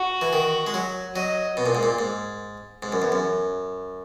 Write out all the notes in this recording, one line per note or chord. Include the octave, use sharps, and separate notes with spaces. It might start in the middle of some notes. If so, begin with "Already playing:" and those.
Already playing: F#4
E3
D#3
G#3
F#3
F#3 D#5
B2
A#2
G#2
A#2
G#2
G#2
F#2
E2
F#2